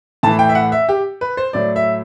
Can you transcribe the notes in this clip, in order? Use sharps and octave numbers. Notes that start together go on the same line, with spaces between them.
A2 E3 A5
G5
E5
F#5
E5
G4
B4
C5
A2 F#3 D5
E5